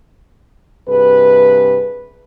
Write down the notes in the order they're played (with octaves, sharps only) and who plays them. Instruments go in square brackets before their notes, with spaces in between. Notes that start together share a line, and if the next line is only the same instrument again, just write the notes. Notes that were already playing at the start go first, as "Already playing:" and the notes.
[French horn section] G2 C3 G#4 B4